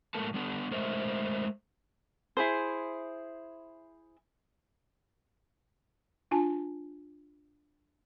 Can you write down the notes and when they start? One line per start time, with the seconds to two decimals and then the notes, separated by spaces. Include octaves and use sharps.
0.14 A2 G#3 A#3 A4 A#4 A5
0.34 G3 B3 D4
0.71 G#3 A3 A#4 C5 D#5 E5
2.37 E4 G#4 C5
6.31 D4 F4 G#5 A5